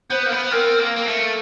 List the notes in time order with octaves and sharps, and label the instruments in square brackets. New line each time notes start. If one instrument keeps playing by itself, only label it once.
[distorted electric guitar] B3 [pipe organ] C5
[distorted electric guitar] A#3
B3
[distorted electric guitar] C4 [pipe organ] A#4
[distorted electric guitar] A#3
A#3
A3